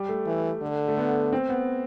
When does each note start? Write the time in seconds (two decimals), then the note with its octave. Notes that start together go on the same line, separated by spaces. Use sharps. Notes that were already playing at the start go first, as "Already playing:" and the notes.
Already playing: G3
0.09 A3
0.26 E3
0.62 D3
0.88 A3
0.97 B3
1.33 C4
1.49 B3